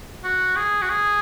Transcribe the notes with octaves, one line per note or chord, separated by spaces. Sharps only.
F#4
G#4
F#4
G#4